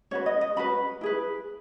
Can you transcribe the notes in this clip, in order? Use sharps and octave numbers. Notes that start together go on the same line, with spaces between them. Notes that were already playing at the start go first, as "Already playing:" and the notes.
C#4 F#4 B4 C#5
D#5
D#5
C#4 F#4 B4 B5
E4 G#4 B4